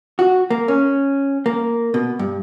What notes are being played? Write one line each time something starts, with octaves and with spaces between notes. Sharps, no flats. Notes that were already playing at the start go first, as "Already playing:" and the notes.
F#4
A#3
C#4
A#3
B2
G2